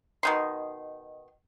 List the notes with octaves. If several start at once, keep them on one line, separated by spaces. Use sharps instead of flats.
B2 D#3 C6